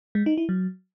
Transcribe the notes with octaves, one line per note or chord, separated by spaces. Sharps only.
G#3
D#4
E4
F#3